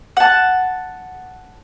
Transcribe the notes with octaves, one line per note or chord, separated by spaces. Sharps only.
F#5 A5